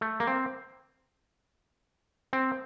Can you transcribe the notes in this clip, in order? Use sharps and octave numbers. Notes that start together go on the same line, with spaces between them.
A3
A#3
C4
C4